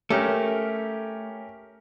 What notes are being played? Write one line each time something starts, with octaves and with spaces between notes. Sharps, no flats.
A3 C#4 G4 A#4